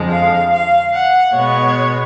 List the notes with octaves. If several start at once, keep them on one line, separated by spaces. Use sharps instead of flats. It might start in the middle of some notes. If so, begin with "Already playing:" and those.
Already playing: F2 D3 F3 G#3
F5
F5
F#5
B2 G#3 B3 C#5